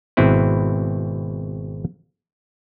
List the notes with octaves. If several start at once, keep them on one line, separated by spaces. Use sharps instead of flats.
G#1 B2 C4 E4 B4